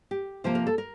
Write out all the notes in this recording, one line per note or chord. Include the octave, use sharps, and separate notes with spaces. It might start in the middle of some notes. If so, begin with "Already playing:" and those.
G4
C3 F3 A#3 C5
A#4
A4
A#4